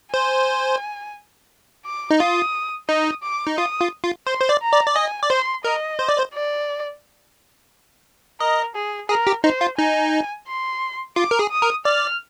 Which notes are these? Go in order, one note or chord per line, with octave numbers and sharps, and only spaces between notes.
C5 G#5
D6
D#4
F4 D#6
D#4 D#6
D6
D#4
F4 D#6
F4
F4
C5 C6
C5
D5
A#5
D5
D5
D#5 G#5
D5
C5 C6
A#4 D#5
C5
D5
C5
D5
A#4 D#5
G#4
G#4 A#4
G4
D#4 C5
F4
D#4 G#5
C6
F4 D6
A#4
G#4
D#6
A#4
D5 F6